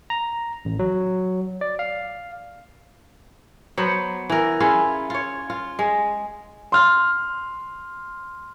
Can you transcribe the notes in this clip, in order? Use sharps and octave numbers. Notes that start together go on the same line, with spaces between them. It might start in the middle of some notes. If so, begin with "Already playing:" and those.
A#5
A1
F#3
D5
F5
F#3 B3 C5
E3 A#4
C#4 E4 F4 G#4
F4 C#5
F4
G#3
C6 F6